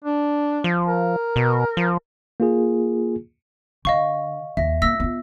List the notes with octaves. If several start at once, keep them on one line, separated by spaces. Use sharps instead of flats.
D4
F3
A#4
B2
F3
A#3 F4 G#4
D3 D#5 F5 C#6
D#2 E5 A#6
A#3 F4 E6 A#6 B6
B3 F4